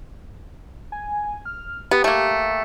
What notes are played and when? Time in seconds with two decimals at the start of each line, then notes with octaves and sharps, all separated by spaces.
0.92 G#5
1.45 F6
1.91 B3 G4
2.04 A3 A#3